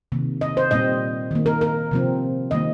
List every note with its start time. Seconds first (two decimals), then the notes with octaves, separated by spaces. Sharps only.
0.12 C3 D#3 A#3
0.41 D#5
0.57 C5
0.71 A#2 G3 C4 D#5
1.31 D#3 A#3
1.46 A#4
1.61 A#4
1.91 C3 F3 C4
2.51 D#3 G3 A#3 D#5